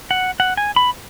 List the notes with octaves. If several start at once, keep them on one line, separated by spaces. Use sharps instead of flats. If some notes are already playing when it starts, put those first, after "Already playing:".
F#5
F#5
G#5
B5